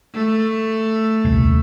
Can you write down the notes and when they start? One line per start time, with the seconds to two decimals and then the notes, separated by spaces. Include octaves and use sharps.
0.14 A3
1.25 D#1 C2